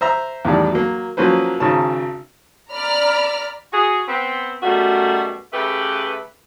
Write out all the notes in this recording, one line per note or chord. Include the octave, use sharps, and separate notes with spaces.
C5 E5 A#5
E2 A2 D#3 G3
F#3 A#3
F3 F#3 A#3 C#4 B4 C5
G#1 C#3 D#4 C#5 A5
D5 A#5 B5 F6
F#4 G#4
B3 C4
F#2 B2 G3 A3 F#4
C#3 A3 G4 B4